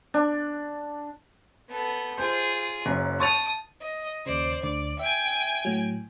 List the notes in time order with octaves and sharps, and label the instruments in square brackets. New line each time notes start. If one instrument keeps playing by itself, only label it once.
[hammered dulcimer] D4
[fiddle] B3 A4
[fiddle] F4 G#4 [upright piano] C5
[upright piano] F#1 F#2
[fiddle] A5 D#6 [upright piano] C#6 A6 F7
[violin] D#5
[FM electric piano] D#2 C#3 [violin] C5 D5
[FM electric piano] D2 D3 D6 [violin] D5
[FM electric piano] E5 [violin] G5 G#5
[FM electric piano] A2 F#3